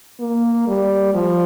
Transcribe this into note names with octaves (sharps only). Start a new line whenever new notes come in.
A#3
G3
F3